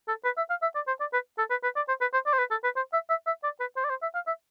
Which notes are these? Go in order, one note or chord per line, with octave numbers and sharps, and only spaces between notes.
A4
B4
E5
F5
E5
D5
C5
D5
B4
A4
B4
B4
D5
C5
B4
C5
D5
C5
B4
A4
B4
C5
E5
E5
E5
D5
B4
C5
D5
C5
E5
F5
E5